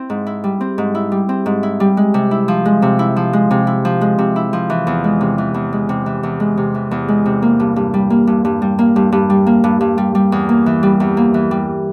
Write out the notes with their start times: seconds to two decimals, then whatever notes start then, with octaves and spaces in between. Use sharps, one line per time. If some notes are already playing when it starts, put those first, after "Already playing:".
Already playing: C4 E4
0.10 G#2
0.26 E4
0.44 G3
0.61 C4
0.78 G#2
0.95 E4
1.12 G3
1.29 C4
1.46 G#2
1.63 E4
1.80 G3
1.97 G#3
2.14 C3
2.31 E4
2.48 F3
2.65 G#3
2.82 C3
2.99 E4
3.16 F3
3.33 G#3
3.51 C3
3.67 E4
3.85 F3
4.01 G#3
4.18 C3
4.36 E4
4.53 F3
4.70 E3
4.87 E2
5.04 G#3
5.21 C3
5.38 E3
5.54 E2
5.73 G#3
5.89 C3
6.06 E3
6.23 E2
6.40 G#3
6.57 C3
6.74 E3
6.91 E2
7.08 G#3
7.26 C3
7.42 A#3
7.60 G2
7.76 G2
7.94 G3
8.10 A#3
8.27 G2
8.45 G2
8.62 G3
8.79 A#3
8.96 G2
9.12 G2
9.30 G3
9.46 A#3
9.64 G2
9.81 G2
9.98 G3
10.15 G3
10.32 E2
10.49 A#3
10.66 E3
10.83 G3
11.00 E2
11.17 A#3
11.34 E3
11.51 G3